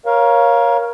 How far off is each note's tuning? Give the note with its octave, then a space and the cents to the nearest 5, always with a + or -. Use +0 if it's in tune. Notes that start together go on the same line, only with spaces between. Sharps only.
A#4 +25 C#5 +0 F5 +0